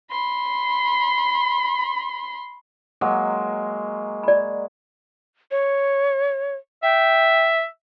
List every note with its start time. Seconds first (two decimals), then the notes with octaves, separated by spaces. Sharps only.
0.11 B5 C6
3.01 F#3 G#3 A#3
4.23 D5 B5
5.51 C#5
6.83 E5 G5